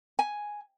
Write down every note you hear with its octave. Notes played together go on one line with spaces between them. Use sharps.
G#5